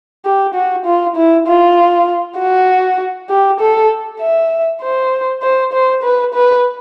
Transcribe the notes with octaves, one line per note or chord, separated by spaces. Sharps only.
G4
F#4
F4
E4
F4
F#4
G4
A4
E5
C5
C5
C5
B4
B4